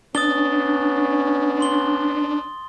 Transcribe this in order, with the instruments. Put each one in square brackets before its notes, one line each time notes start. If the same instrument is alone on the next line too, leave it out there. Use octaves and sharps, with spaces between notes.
[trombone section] B3 C#4 [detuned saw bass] D4 [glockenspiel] D#6 A6 G7
[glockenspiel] C6 G7